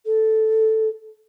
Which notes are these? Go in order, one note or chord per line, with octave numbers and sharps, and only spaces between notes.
A4